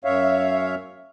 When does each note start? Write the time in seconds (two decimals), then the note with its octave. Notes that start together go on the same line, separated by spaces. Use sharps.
0.04 F#2 C#5 E5 F5